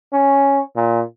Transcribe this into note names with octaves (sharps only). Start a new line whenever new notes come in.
C#4
A#2